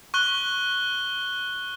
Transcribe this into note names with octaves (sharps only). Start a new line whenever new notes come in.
C#6 F#6 G7